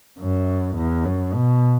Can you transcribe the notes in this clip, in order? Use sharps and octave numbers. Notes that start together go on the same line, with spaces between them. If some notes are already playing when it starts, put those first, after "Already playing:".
F#2
E2
F#2
B2